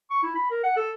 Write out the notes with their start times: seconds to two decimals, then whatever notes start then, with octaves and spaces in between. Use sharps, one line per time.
0.10 C#6
0.23 E4
0.35 B5
0.50 A#4
0.64 F#5
0.77 A4